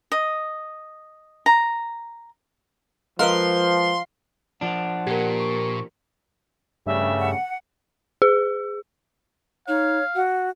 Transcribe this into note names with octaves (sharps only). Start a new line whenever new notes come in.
D#5
A#5
F3 G#3 A#4 B4 F5 C6
F3 D4 F#5
A#2 G4 A#4
C#6
G2 C#3 G3 A3 E5
F#5
G#4
D#4 C#5 F5
F#4 F#5